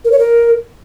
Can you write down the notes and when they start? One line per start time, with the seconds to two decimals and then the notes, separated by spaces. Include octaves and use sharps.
0.05 A#4
0.12 C#5
0.19 A#4